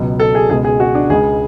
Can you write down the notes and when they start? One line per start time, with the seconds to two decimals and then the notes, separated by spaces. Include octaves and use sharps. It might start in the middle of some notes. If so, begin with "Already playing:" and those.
Already playing: C#2 B2 F#3
0.20 A4
0.35 G#4
0.50 C#2 B2 G#3 G#4
0.64 G#4
0.80 F#4
0.95 D4
1.10 C#2 C#3 G#3 G#4